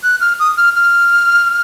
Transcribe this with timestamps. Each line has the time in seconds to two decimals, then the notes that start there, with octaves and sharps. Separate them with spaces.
0.03 F#6
0.21 F6
0.40 D#6
0.57 F6
0.75 F6